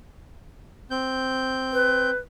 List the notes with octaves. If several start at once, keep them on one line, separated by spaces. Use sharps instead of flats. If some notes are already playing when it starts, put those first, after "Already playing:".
C4 G6
B4